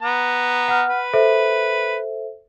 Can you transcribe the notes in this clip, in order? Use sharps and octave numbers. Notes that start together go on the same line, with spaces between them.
B3 A#5
F#5 F6
B4
A4 C5 E5